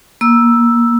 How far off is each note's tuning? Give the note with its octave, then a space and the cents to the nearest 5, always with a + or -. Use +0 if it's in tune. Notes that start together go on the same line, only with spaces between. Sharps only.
A#3 +20 E6 +0